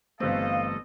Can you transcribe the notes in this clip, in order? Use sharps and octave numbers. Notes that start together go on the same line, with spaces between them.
G1 E3 G3 A3 C4 A4 D#5 F5